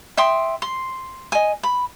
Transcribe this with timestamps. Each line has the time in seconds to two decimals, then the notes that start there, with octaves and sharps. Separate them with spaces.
0.17 E5 G5 C6 D#6
0.62 C6
1.32 D#5 G#5
1.63 B5